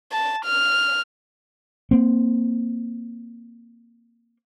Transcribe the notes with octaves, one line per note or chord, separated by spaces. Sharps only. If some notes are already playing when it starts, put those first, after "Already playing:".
A5
F6
A#3 C4